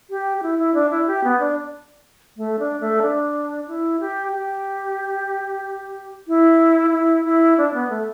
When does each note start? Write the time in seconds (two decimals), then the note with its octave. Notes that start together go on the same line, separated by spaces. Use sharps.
0.10 G4
0.38 G4
0.43 E4
0.58 E4
0.74 D4
0.90 E4
1.07 G4
1.24 B3
1.40 D4
2.37 A3
2.59 D4
2.80 A3
3.02 D4
3.67 E4
4.00 G4
4.32 G4
6.28 E4
6.92 E4
7.25 E4
7.58 D4
7.74 B3
7.89 A3